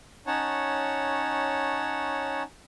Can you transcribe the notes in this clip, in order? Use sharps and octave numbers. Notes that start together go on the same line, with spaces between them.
C#4 D#4 C#5 F#5 A5